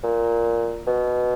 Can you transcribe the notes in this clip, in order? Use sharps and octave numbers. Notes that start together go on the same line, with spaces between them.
A#2
B2